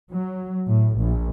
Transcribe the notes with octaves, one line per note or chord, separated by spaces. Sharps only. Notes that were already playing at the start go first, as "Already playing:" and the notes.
F#3
A2
A#1